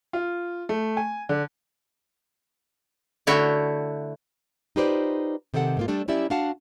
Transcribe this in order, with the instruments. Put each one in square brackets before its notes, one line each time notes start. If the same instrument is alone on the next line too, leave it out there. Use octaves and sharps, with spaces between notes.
[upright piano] F4
A3
G#5
D3
[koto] D3 A3 E4 F#4 C#5 G5
[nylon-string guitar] D#4 F4 G4 B4 C5 D5
C3 D#3 G4 A4 F#5
G#2 A#3 F4
G3 A3 D4 A4
F#3 C#4 E4 G4 D5 E5
D4 F#4 F5 F#5 A5